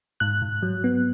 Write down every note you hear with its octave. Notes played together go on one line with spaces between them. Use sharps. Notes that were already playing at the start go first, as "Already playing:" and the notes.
G#2 F#6
G#2
F#3
B3